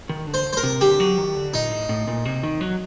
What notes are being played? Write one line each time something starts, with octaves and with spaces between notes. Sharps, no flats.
D#3
D3
C5
C5
A#4
C3
D3 G4
F#3
D#3
D3
A#2 D#4
A2
A2
A#2
C3
D#3
F#3